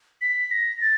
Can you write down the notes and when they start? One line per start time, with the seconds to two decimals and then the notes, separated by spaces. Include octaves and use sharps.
0.21 B6
0.51 A#6
0.81 A6